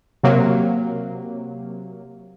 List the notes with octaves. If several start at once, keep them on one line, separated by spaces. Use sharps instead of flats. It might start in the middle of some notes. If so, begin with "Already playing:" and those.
C3 F#3 A#3